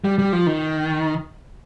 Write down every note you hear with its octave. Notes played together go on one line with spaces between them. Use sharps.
G3
G3
F3
D#3